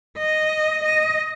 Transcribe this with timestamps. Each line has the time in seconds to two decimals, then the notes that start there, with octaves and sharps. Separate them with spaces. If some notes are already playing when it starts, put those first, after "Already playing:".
0.18 D#5
0.84 D#5